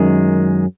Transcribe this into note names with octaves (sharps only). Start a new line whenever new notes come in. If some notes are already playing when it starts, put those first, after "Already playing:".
Already playing: F#2 D#3 G#3